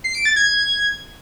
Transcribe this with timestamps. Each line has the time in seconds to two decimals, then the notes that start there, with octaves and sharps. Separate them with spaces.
0.04 C7
0.15 D7
0.25 A6
0.36 G#6